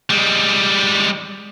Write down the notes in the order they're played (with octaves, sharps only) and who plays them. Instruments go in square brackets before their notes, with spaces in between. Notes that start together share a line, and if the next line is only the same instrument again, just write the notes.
[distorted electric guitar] G3 G#3